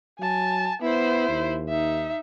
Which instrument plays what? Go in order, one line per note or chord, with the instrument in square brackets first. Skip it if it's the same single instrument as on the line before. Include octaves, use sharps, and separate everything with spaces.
[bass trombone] F#3 [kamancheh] G#5 A5
[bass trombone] B3 [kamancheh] E4 C5
[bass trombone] D#2
[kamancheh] D#4 E5